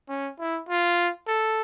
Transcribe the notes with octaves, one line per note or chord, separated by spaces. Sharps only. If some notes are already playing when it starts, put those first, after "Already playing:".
C#4
E4
F4
A4